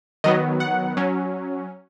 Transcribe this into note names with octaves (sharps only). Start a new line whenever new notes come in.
D#3 F#3 B3 D#5
F#5
F#3 C#4